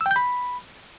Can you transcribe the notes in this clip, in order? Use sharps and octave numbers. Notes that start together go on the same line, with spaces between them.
E6
G5
G6
B5